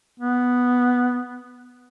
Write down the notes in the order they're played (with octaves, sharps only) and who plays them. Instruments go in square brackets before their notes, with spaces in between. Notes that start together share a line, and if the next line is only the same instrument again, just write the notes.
[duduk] B3